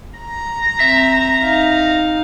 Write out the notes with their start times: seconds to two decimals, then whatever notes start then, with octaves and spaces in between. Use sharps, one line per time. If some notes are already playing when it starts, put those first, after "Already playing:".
0.19 A#5
0.80 C4 E5
1.43 D#4 F5